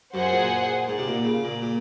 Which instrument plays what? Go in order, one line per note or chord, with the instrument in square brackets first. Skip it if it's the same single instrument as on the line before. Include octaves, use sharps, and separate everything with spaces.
[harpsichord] F#2 [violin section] G#4 C5 F#5
[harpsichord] A#2
G#2
C3
A#2
C#3
A#2
A#2